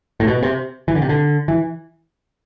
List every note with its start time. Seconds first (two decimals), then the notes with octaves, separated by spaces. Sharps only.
0.20 A2
0.27 B2
0.43 C3
0.88 E3
0.95 D3
1.02 C3
1.09 D3
1.48 E3